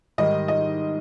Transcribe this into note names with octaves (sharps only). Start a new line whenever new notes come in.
G#2 D#3 G3 D#5
D#5